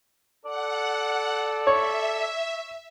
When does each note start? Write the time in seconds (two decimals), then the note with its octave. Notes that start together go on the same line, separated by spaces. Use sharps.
0.45 A4 D5 F#5
1.67 C#5 E5